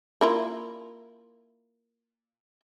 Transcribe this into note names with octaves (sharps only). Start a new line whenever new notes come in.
A#3 E4 F4